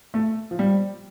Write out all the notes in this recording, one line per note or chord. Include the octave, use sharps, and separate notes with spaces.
A3
F3
G3